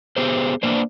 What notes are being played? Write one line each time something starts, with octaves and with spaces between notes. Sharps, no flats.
B3 G4 G#4 C5
A#3 B3 D4 C5